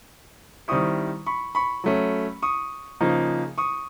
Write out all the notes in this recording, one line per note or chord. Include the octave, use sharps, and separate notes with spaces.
D#3 G3 C4 E4 C#6 D#6
B5 C#6
B5 C#6
F#3 A3 C#4
C#6 D#6
C#3 F3 A#3 D#4
C#6 D#6